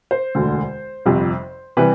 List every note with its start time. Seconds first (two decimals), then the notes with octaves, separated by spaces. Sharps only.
0.11 C5
0.35 E1 D2 D3
1.06 G1 F2 C3
1.77 C3 E3 G3 B4